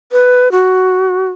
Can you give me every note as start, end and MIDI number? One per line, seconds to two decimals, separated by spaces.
0.12 0.51 71
0.52 1.28 66